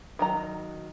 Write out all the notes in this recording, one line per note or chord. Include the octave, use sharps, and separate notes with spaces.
D#3 F#3 A#5